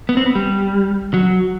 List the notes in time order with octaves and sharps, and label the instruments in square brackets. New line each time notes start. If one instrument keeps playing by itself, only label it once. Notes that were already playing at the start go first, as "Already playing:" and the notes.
[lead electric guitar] B3
C4
B3
G3
F#3